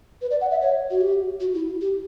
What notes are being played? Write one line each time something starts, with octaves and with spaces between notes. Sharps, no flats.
B4
D5
F#5
E5
C#5
F#4
G4
F#4
E4
G4